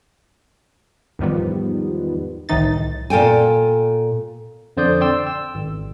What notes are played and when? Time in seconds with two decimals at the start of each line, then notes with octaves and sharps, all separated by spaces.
1.19 E2 G#2 D#3 F3 G3 B3
2.49 C2 A2 D#3 E3 D#4 A6
3.10 A#2 A4 G5 G#5
4.77 F2 D3 C5 D5 D#6 G6
5.01 D5 G5 C6 E6
5.27 E6
5.55 G#1